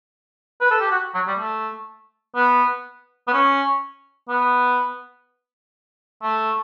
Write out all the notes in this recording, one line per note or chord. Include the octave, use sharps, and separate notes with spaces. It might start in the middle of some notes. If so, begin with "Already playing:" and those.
B4
A4
G4
F#4
F#3
G3
A3
B3
B3
C#4
B3
A3